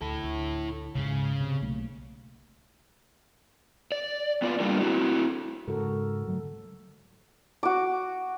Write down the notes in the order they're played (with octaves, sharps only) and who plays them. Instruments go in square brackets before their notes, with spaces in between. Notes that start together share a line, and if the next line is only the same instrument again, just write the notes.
[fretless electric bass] D2 [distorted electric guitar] E4 A4
[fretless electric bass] D2
[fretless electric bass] C#2 G#2 [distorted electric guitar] C#3
[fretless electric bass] C3
B1 A3 A#3
[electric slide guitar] D5
B3 F4 D5
G3 A#3 D4 F4 A#4
C4 E4 F#4
[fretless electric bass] G#2 C#3 [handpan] F#4 A4 A#4
[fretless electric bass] D3 F#3 A3
[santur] F#4 D6